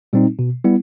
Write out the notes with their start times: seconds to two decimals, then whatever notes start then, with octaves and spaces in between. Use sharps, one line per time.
0.13 A#2 G3 C4 D#4
0.39 B2
0.64 G3 B3 E4